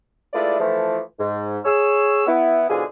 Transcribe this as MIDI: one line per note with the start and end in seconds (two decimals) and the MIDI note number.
0.33 0.59 56
0.33 0.59 57
0.33 0.59 64
0.33 0.59 65
0.33 0.59 71
0.33 0.59 74
0.59 0.99 52
0.59 0.99 53
0.59 0.99 57
1.19 1.58 44
1.65 2.23 68
1.65 2.23 73
1.65 2.23 88
2.26 2.66 59
2.26 2.66 64
2.69 2.83 44
2.69 2.83 47
2.69 2.83 50
2.69 2.83 65
2.69 2.83 68